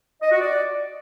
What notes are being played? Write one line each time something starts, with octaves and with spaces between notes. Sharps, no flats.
D#5
F#4
D5